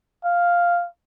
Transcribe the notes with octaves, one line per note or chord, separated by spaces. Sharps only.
F5